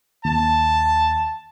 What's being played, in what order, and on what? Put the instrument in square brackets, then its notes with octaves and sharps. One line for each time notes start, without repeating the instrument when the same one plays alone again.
[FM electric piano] D#2 [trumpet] A5